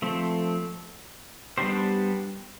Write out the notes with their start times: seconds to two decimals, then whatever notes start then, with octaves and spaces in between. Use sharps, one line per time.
0.02 F3 A3 C4
1.58 G3 B3 D4 G4 C5